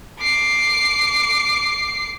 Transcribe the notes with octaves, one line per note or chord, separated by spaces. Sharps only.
D6 C7